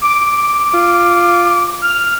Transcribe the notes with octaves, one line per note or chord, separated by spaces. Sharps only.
D6
F4
F6